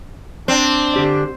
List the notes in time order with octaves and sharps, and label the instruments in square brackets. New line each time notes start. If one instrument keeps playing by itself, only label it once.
[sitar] C4 [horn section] D4
[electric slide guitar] D3 G4 D5